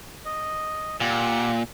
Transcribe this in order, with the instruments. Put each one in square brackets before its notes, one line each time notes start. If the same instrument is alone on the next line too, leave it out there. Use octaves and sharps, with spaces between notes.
[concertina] D#5
[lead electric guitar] A#2 [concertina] G4 F#5 E6